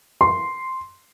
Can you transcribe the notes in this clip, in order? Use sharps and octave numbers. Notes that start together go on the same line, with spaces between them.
C6